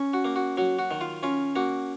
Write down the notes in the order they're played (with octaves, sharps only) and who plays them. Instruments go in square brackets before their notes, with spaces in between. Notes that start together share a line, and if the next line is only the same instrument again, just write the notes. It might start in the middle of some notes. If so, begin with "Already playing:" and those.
Already playing: [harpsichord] C#4
F#4
A#3
F#4
F#3 F#4
F#4
D#3
F4
C#4 F4
A#3 F#4